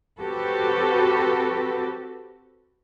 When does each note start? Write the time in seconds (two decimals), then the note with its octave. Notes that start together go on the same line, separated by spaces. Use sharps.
0.20 C4 F#4 G4 A4 B4